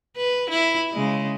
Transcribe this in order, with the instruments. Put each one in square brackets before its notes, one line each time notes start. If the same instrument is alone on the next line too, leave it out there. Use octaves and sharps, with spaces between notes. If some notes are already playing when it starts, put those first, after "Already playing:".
[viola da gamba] B4
E4
C#3 G#3